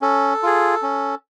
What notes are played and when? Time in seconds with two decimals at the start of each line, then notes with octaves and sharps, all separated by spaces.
0.02 C#4 A4
0.43 F4 G#4
0.82 C#4